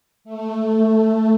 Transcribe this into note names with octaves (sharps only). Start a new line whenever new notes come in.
A3